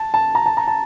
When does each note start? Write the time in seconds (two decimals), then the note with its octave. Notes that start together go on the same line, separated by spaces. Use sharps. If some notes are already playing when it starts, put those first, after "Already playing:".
Already playing: A5
0.14 A5
0.35 A#5
0.46 A5
0.57 A#5
0.68 A5